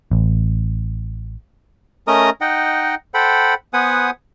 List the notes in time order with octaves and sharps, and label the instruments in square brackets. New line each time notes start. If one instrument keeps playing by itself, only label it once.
[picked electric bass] A1
[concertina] A3 C#4 A#4 D#5 A#5 D#6
D#4 D#5 F#5 G5
A4 C5 F#5 G5 B5
B3 B4 C5 F#5 G#5 D#6